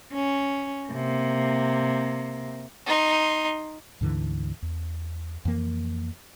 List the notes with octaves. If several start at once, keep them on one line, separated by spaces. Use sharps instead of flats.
C#4
C3 A#3
D#4 C6
D2 G#2 D3 E3
E2
F2 E3 A#3